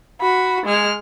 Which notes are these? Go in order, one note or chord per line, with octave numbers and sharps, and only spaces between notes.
F#4 B5
G#3 F6